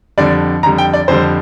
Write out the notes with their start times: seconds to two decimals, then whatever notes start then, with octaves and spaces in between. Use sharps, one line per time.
0.18 F2 D3 G3 D5
0.63 F2 D3 G3 A#5
0.78 G5
0.94 D5
1.08 F2 D3 G3 C5